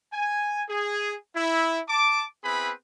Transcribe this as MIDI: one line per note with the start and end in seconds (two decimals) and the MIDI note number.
0.13 0.63 80
0.69 1.14 68
1.36 1.80 64
1.89 2.24 81
1.89 2.24 86
2.44 2.71 59
2.44 2.71 60
2.44 2.71 64
2.44 2.71 68
2.44 2.71 71
2.44 2.71 83